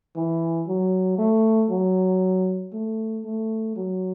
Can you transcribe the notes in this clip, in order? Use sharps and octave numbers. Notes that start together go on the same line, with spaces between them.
E3
F#3
A3
F#3
A3
A3
F#3